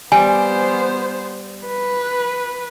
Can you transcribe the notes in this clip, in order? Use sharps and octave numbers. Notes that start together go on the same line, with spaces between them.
G3 B3 C5 G#5
B4